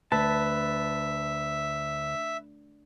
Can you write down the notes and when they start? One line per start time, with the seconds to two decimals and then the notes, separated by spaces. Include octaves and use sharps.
0.12 D2 B4 E5 A5